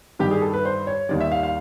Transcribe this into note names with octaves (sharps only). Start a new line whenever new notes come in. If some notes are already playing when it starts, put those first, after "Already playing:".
G2 D#3 G3 G4
G#4
A4
B4
C5
C#5
D#2 D#3 G3 D5
E5
F5
F5